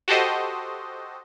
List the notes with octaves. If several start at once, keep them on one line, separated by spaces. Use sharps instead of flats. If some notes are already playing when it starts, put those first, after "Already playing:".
F#4 G4 A4 C5 D#5